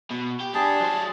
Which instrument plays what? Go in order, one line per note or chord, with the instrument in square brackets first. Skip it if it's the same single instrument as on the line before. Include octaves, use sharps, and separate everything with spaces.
[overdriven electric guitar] B2
G4
[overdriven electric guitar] D4 G4 [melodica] G#4 A5
[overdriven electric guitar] F#3 C5